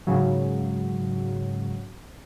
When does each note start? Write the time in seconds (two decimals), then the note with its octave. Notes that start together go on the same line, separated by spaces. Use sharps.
0.07 G#2 C#3 F#3